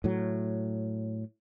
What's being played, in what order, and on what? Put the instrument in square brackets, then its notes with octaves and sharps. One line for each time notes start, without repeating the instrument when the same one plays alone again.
[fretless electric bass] A2 F#3